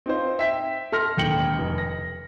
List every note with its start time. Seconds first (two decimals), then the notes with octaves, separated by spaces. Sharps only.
0.06 C4 D#4 F4 C5
0.39 E5 G5 B6
0.92 A4 C6 F6 A#6
1.17 E1 D#2 G5 C#7 F#7
1.59 F1
1.78 A#6